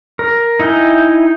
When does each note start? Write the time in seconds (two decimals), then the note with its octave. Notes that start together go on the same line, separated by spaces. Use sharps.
0.19 A#4
0.60 D#4 E4 D#5 G5 G#5